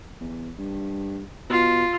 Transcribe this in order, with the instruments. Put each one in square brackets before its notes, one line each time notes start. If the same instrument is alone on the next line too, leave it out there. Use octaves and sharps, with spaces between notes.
[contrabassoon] E2
G2
[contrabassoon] B2 [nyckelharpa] F4